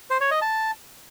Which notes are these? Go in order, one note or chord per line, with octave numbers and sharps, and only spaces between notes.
C5
C#5
D#5
A5